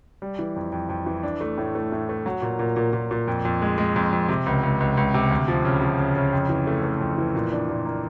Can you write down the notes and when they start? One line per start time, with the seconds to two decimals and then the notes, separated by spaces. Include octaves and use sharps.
0.22 G3
0.39 E3
0.56 F2
0.72 F2
0.89 F2
1.06 E3
1.23 D4
1.41 A3
1.58 A2
1.75 A3
1.92 A2
2.09 A3
2.26 F#3
2.42 A#2
2.59 A#2
2.76 A#2
2.93 A#2
3.11 A#2
3.28 F2
3.45 F2
3.62 G#3
3.78 G#3
3.96 F2
4.13 F2
4.29 C3
4.46 C#2
4.63 C#2
4.80 C#2
4.97 C#2
5.14 C3
5.31 D2
5.48 F3
5.65 C#3
5.82 F3
5.99 C#3
6.16 C#3
6.33 F2
6.49 E3
6.67 A3
6.84 A3
7.01 F2
7.18 E3
7.35 A#2
7.52 D4
7.69 A#2
7.86 A#3